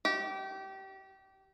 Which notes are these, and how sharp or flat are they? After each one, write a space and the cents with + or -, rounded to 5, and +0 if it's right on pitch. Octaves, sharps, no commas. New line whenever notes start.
G4 -25